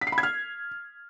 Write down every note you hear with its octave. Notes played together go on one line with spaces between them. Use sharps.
B6
C7
B5
G#6
F6